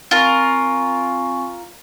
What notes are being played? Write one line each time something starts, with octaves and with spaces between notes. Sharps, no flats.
C4 F4 A#4 G#5 C#6